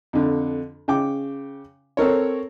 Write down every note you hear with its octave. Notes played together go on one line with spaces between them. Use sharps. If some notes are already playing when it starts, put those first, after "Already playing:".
F2 D3
C#3 G5 D6
C4 A4 A#4 C#5